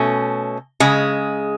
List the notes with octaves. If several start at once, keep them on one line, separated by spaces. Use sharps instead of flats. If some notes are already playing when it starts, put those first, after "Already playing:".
Already playing: B2 A3 C#4
C#3 G#3